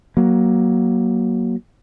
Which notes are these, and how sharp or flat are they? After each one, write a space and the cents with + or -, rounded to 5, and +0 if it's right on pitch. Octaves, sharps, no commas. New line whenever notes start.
F#3 +15 A#3 +20